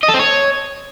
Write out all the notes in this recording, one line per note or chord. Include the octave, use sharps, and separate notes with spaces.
D#5
A4
C4
C#5